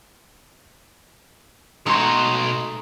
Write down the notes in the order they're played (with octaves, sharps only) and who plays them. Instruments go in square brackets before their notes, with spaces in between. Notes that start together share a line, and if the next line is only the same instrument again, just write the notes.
[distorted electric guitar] B2 C#5 [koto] G#3 A3 D#4 [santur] C6 D#6